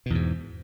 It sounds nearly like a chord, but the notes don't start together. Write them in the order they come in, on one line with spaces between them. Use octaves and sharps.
B2 E2 G#2